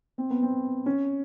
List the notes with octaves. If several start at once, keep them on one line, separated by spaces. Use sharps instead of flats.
C4
B3
C4
C#4